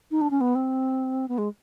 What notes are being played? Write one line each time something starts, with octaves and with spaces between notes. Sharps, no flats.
D#4
D4
C#4
B3
C4
B3
G#3